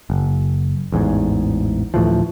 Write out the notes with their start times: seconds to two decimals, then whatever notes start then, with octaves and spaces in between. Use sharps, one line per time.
0.10 F#1
0.92 A1 E2 G#2
1.94 D2 A2 E3 F3